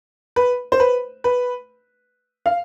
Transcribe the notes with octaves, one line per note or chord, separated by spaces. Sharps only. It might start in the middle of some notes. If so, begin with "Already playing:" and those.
B4
C5
B4
B4
F5